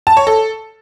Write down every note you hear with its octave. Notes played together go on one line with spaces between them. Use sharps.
A5
C#5
A4